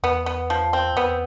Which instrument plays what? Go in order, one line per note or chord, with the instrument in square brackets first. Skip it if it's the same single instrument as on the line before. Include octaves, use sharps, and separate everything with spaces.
[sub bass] E2 [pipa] B3
[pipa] B3
F3
C4
[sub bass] E2 [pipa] B3